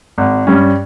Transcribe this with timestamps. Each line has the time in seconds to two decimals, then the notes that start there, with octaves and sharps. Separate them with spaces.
0.18 G#1
0.47 G2 G3 C#4